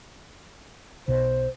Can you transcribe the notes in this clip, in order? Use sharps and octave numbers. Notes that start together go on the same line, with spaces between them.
B1 B2 C5